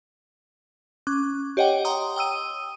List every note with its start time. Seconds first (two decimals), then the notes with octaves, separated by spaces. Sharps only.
1.07 C#4 D6 F#6
1.57 G4 C#5 D#5 F#5 G5
1.85 G5 A#5 C6 D#6
2.16 G5 D#6 E6 D#7